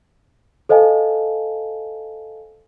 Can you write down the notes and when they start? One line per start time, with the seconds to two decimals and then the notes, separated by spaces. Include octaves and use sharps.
0.69 A4 C5 D#5 F5 G#5 A5